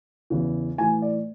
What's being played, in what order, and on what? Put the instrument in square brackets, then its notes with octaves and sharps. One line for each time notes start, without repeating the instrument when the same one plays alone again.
[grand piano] E2 C#3 E3
A2 E3 G#5
D5